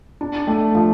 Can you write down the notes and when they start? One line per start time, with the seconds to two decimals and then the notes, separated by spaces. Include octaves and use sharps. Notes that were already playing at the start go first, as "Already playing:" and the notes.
0.21 D4
0.47 A3
0.75 F3